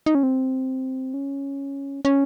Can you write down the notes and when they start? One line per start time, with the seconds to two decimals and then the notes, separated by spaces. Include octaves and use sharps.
0.06 D#4
0.15 C#4
0.23 C4
1.14 C#4
2.05 C#4